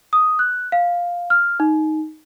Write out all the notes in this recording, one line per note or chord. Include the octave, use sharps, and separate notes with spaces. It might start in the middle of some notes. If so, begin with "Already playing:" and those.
D#6
F#6
F5
F6
D#4